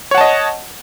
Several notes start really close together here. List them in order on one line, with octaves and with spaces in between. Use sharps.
C#5 F#5 A5 D#5